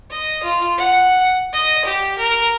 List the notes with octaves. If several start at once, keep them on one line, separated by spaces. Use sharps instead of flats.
D#5
F4
F#5
D#5
G4
A#4